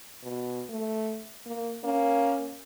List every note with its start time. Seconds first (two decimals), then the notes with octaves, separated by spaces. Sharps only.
0.23 B2
0.69 A3
1.46 A#3
1.84 A#3 C#4